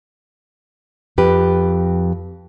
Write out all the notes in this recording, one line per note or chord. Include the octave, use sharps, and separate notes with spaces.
F2 G4 B4